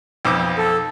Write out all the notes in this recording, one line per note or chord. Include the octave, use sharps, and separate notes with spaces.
B1 F2 D6
A4